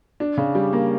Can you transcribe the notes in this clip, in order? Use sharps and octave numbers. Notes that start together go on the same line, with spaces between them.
D4
C#3
G3
A#3